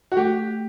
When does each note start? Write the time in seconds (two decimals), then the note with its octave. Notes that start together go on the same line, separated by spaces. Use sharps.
0.12 F#4
0.17 A3 G4